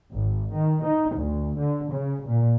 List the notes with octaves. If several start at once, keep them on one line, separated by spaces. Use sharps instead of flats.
G#1
D#3
D#4
D2
D3
C#3
A#2